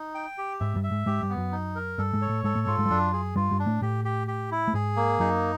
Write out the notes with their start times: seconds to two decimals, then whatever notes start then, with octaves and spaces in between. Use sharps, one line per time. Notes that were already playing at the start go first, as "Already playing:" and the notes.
Already playing: D#4
0.15 G5
0.38 G4
0.60 G#2 G#3 E5
0.75 G2 G3
0.83 E5
0.91 G#2 G#3
1.06 G#2 G#3 G4
1.22 G2 G3
1.29 B3
1.37 F#2 F#3
1.52 D#4
1.75 A#4
1.98 G2 G3 A4
2.13 G#2 G#3
2.21 C#5
2.29 A2 A3
2.44 G#2 G#3 A4
2.55 A2 A3
2.67 G#2 G#3 F4
2.78 G#2 G#3
2.85 G3
2.90 F#2 F#3 D4
3.13 G#4
3.36 G2 G3 F4
3.51 G2 G3
3.59 D4
3.66 A2 A3
3.81 A2 A3 G4
4.05 G4
4.27 G4
4.51 E4
4.68 A3
4.74 G#2 G#3 G#4
4.96 A#3
5.19 F#2 F#3 D#4